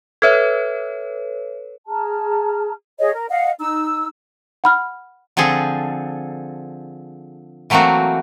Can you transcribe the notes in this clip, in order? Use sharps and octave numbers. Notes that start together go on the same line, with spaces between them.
A4 B4 C#5 E5 F6 G#6
G#4 A5 A#5 F6
G#4 C#5 D#5
A#4
D#5 F5 F#5
D#4 E6
F#5 B5 F6
D3 F3 C4 G#4 A4
E3 F#3 A3 A#3 C4 F#4